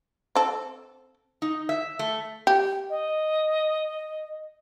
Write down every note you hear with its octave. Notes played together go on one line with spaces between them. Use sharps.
C4 A4
D#4
E5
A3
G4
D#5